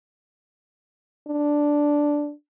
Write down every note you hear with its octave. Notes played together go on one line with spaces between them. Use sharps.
D4